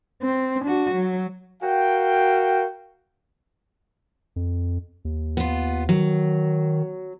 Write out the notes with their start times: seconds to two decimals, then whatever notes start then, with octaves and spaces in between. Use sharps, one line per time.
0.22 C4
0.64 D4 F#4
0.94 F#3
1.63 F#4 A#4 F5 G5
4.36 F2
5.05 D#2
5.37 B3 F4
5.89 D#3 F#3